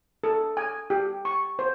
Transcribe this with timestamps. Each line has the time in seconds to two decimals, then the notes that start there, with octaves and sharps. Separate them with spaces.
0.24 A4
0.57 G#5
0.90 G4
1.25 C#6
1.59 C5